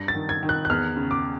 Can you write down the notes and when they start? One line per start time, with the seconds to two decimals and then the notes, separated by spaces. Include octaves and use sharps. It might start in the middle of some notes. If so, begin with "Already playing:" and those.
Already playing: G2 A#6
0.08 A6
0.15 D#3
0.29 G#6
0.43 D#3
0.49 F#6
0.65 F#6
0.70 E2 F6
0.96 C#3
1.11 D6